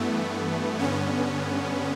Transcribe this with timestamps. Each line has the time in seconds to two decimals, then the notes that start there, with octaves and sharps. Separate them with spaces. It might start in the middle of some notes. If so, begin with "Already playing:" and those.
Already playing: G2 E3 A3 B3
0.79 G2 D3 B3 C#4